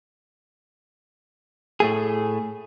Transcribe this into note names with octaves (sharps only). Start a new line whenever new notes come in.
A2 A3 G#4